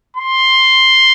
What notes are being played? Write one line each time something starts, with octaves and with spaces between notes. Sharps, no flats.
C6